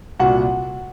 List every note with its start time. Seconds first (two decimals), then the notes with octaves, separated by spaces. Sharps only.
0.19 C2 A#2 F#4 F#5